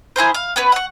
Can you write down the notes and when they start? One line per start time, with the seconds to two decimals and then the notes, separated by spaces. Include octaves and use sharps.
0.16 E4 G#4 A#4 C5
0.34 F5
0.56 B3 C#4 B4
0.72 F#5 C#6